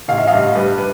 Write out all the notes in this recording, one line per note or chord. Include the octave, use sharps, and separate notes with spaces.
A1 F5
E5
D#5 F5
G2
G3 B4
B4